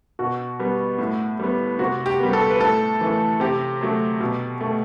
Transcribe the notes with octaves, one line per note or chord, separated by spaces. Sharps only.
B2 F#4
G3 B3
A2
G3 B3
C3 F#4
G4
G3 B3
A4
B4
A2 A4
E3 A3
C3 G4
F#3 A3
B2
A3